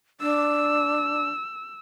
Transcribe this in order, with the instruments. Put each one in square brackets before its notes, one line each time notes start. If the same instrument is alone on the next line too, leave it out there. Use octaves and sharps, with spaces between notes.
[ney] D4 [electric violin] E6